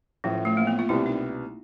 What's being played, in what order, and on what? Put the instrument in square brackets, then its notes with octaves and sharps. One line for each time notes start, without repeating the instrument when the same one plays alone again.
[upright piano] A1 A2 F3 [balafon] F#3
[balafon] A3
A#3
B3
F4
[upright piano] C2 B2 G3 B3 [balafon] E4
[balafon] D#4